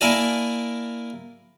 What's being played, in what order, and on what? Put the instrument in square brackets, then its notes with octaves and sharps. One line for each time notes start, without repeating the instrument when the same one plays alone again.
[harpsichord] A#3 E4 A#4 D5 G#5 A5